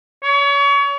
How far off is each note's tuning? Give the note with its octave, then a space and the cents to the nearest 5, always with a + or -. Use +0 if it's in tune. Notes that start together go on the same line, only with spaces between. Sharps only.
C#5 +30